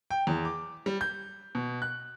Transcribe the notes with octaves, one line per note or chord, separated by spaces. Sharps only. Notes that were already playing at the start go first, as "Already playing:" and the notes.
G5
E2
D6
G3
G6
B2
F#6